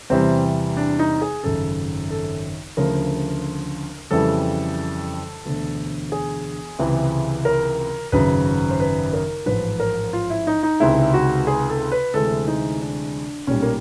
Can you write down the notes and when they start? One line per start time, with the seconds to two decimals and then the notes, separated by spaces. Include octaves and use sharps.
0.10 E2 C3 E3 G3 C4
0.77 D4
0.99 D#4
1.22 G#4
1.43 G#1 F#2 C#3 A4
2.10 A4
2.77 D2 C#3 F3 A#4
4.11 F2 C#3 E3 G3 A4
5.45 E1 D2 D3
6.12 G#4
6.79 C#2 C3 E3
7.45 A#4
8.12 G#1 F#2 C#3 F#3 B4
8.70 C5
8.80 B4
9.13 A#4
9.46 A1 G#2 F3 B4
9.80 A#4
10.13 F4
10.30 E4
10.47 D#4
10.63 D#4
10.80 C#2 C3 D#3 G#3 E4
11.14 F#4
11.47 G#4
11.69 A4
11.92 B4
12.14 D2 C3 E3 G#3 A4
12.48 D#4
12.81 D4
13.47 B1 A#2 G3 C#4
13.62 A#3